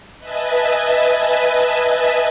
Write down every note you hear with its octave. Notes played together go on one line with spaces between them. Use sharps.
B4 D#5 E5 G#5 A5